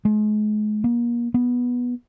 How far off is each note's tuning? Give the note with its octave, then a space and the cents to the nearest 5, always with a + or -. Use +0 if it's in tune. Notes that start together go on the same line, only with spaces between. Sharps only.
G#3 +35
A#3 +35
B3 -10